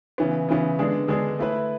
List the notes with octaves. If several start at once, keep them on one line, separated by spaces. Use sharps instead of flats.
C#3 E3 B3
C#3 E3 B3
D3 G#3 B3 D4 G#4
D3 G#3 B3 D4 G#4
A3 E4 B4